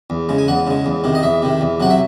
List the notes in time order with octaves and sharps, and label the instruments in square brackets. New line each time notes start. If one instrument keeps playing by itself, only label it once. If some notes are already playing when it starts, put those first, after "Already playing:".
[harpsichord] E2
C#3 G#3
G#5
E2 F#5
C#3 G#3
E2
C3 D#3
D#5
E2 E5
C3 D#3
E2
C3 F#3 F#5
E5